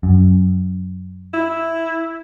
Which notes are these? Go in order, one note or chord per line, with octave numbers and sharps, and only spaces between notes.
F#2
E4